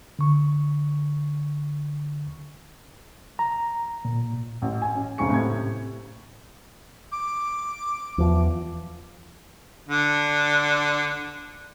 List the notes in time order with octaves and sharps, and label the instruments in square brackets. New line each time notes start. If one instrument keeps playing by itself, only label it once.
[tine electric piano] D3 C#6
[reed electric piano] A#5
A#2
[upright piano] A1
G#5
C#4
F1 G#2 C#3 G#5 C#6 C#7
A2 C3 G#6
[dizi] D6
[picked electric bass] E2 F3
[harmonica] D3 D4